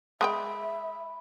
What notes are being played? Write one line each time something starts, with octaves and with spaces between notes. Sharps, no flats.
G#3 G#4 E5 G5 B5